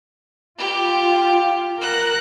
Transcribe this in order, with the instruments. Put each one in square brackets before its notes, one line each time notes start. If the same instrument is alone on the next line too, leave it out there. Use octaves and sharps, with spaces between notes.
[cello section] F4 [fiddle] G4
[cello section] A#4 [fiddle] F#5 F#6